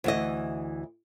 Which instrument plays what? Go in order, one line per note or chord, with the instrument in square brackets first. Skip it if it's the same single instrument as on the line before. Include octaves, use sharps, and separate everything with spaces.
[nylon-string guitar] D2 E3 D#5